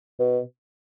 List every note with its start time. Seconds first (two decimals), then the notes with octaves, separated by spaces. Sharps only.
0.19 B2